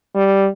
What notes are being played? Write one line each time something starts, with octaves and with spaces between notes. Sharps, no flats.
G3